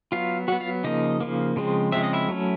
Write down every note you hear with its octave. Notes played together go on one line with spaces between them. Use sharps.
F#3 B3 F4 F5
F#3 B3 F#4 F#5
F4 F5
C#3 F3 A#3 D#4 D#5
C#3 F3 A#3
C#3 F3 G#3 C4
C#3 F3 G#3 C4 E5
D#5
E4 E5
F#3 A3 C#4